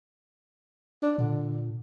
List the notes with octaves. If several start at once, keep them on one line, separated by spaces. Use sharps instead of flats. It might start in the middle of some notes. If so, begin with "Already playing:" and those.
D4
A#2 D3